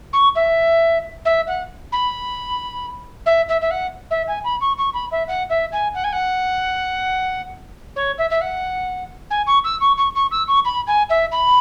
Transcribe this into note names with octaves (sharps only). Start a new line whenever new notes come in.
C#6
E5
E5
F#5
B5
E5
E5
E5
F#5
E5
G#5
B5
C#6
C#6
B5
E5
F#5
E5
G#5
F#5
G#5
F#5
C#5
E5
E5
F#5
G#5
C#6
E6
C#6
C#6
C#6
E6
C#6
B5
G#5
E5
B5